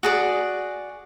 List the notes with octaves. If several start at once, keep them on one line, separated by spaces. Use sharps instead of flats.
F#4 G#4 D5